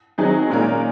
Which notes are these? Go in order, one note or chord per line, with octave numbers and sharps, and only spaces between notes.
D#3 F#3 C4 D#4 G#4
A#2 G#3 C#4 F4 A#4